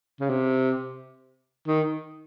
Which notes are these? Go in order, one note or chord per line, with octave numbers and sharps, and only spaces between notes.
C#3
C3
D#3